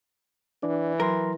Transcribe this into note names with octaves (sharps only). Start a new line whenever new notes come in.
E3 D4 D5
F#3 A#4 C6